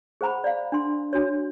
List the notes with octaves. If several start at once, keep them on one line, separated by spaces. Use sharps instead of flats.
G#4 C5 F#5 A#5 B5
D5 F5
D4 C6
D4 F#4 C#5